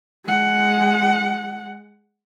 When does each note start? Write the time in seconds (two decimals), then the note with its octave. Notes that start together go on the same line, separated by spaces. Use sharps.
0.25 G#3 F#5